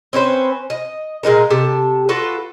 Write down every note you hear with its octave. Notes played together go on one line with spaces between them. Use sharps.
C4 C#4 B4 C5
D#5
A#2 G#3 D#4 A#4
C3 G4 A4 A5
F4 F#4 A4 B4